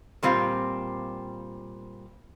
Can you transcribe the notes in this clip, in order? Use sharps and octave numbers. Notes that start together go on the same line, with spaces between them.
A#2 G3 C4 F4